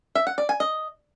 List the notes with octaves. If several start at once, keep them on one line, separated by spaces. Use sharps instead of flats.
E5
F#5
D5
G#5
D#5